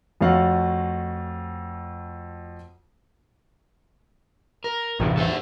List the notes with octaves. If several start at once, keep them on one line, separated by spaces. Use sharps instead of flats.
F2 A3 F#4 C#5 F5 F#5
A#4
A1 E2 G2 C3
A4 C5 E5